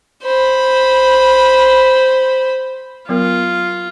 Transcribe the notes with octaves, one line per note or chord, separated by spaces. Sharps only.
C5 B5
F#3 B3 F4 A#4